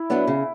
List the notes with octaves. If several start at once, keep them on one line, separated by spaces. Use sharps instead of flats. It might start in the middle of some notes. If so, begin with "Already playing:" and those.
Already playing: E4
F#3 B3 D4
C#3